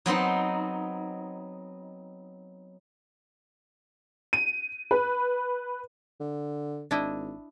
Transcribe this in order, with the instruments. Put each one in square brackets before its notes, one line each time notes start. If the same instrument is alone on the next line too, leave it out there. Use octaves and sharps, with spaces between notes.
[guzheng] F#3 B3 C4 D#4
[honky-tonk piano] D#7
B4
[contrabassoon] D3
[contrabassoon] G#1 [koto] D4 E4 D#5